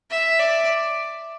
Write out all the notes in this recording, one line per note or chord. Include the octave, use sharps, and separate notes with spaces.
E5
D5